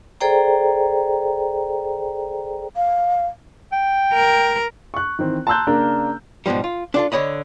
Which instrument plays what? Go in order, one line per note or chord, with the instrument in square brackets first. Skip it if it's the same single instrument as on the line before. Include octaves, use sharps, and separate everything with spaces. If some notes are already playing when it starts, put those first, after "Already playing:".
[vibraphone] G#4 A4 C5 D5 G5 A#5
[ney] F5
[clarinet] G5
[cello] A#4
[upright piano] C#6 F#6
D#3 E3 C4
A5 A#5 C6 E6 F#6 G6
C#3 A#3 D4 A#4
[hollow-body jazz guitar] G#2 B2 D3 F3 G3
F4
D4 F4 A4
D3 A#4 C#5 D#5 B5